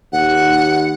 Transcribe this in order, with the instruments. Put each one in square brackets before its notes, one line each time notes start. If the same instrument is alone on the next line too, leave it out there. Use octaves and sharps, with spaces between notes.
[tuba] D#2 [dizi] F#5